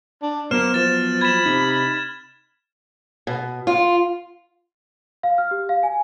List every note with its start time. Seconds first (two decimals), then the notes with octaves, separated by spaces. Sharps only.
0.22 D4
0.51 F#3 A#3 B3 C5 F6 E7
0.74 F3 A6 E7
1.21 B5 G#6 E7
1.46 C3 D#4
3.27 B2
3.67 F4
5.23 F5
5.38 F6
5.51 G4
5.69 F5
5.83 G#5